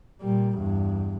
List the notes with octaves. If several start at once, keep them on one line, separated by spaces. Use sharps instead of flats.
A#2 G3
E2 G2